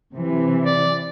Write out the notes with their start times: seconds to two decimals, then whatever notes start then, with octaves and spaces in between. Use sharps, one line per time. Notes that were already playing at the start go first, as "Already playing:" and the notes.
0.14 C3 E3
0.66 D5